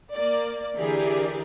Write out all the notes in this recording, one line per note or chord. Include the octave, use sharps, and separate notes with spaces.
A#3 D5
D3 E3 G4 G#4 A#4 D5